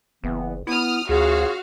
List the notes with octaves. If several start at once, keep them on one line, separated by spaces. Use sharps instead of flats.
F#1 E3 B3
B3 E4 D#6 F6
D2 C#4 F4 F#4 G#4 F5